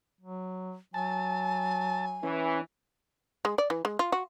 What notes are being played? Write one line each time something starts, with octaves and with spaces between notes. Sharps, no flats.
F#3
F#3 G#5 A5
E3 C#4
G#3
D5
E3
G#3
F4
F#4